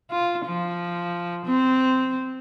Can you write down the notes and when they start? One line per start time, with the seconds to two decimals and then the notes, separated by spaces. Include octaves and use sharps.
0.11 F4
0.46 F3
1.46 C4